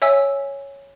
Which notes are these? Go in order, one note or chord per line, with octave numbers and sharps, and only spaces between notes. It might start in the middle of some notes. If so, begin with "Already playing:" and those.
C#5 E5 G#5 E6